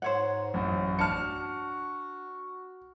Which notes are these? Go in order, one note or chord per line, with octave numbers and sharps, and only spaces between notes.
G#2 C5 C#5 F#5
A1 F#2 F#4
D4 A5 F6 C#7